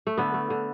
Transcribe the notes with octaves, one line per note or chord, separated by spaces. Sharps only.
A3
D3 B3
A3
D3